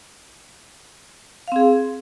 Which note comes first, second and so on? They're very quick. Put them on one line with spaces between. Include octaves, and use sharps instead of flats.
F5 C4 G#4